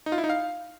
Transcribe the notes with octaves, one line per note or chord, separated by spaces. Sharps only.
D#4
F4
E4
D#4
F5